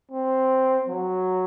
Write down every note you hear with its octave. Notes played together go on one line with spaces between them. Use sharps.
C4
F#3